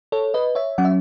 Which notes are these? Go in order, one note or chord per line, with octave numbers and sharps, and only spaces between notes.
A4 C#5
B4 D#5
C#5 E5
F#3 C#4 F#5
E5